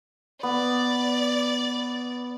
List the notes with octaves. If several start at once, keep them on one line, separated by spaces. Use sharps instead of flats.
B3 D5